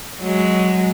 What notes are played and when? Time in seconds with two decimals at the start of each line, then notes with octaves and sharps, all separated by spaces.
0.21 F#3 G#3